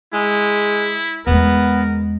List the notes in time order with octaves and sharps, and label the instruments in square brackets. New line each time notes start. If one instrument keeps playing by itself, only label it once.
[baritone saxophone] G#3 [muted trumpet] E4
[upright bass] E2 G#3 [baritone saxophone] B3 [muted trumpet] A#4